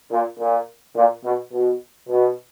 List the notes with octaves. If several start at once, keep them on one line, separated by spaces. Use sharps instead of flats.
A#2
A#2
A#2
B2
B2
B2